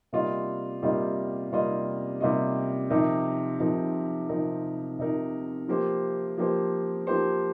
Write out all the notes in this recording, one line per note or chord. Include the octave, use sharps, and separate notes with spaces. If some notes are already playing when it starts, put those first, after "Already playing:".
C3 G3 A#3 F4 D#5
C3 G3 A#3 F4 D#5
C3 G3 A#3 F4 D#5
C3 G3 A#3 F4 D#5
C3 F3 D#4 A#4
C3 F3 D#4 A#4
C3 F3 D#4 A#4
C3 F3 D#4 A#4
F3 A#3 G4 C5
F3 A#3 G4 C5
F3 A#3 G4 C5